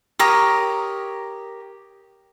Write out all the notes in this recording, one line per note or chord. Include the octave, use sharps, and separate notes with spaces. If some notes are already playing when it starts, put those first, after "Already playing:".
G4 A#4 C#5 D#6